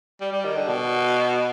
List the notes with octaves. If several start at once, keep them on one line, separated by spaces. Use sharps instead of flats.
G3
G3
D#3
D3
B2